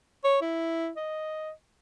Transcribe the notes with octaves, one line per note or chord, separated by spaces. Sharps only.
C#5
E4
D#5